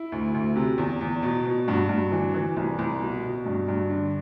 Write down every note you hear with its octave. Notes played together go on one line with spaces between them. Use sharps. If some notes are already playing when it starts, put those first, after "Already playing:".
Already playing: E4
D2
D2
C3
E2
E2
B2
B2
G2 F#4
G2
E3
E3
C2
C2
B2
B2
G2
G2
D3